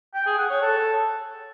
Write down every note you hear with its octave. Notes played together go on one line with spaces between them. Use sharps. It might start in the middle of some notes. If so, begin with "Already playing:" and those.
G5
G#4
F#5
C#5
A4